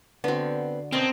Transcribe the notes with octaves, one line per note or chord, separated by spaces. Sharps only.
D3 B3 C4 F#4
B2 C4 C#4 A#4 D#5 A5